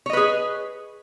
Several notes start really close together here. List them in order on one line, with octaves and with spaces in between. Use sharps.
C#5 D#5 B4 G#4